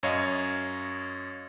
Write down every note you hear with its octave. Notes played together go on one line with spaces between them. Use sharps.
F#2 C#5 D#5 F5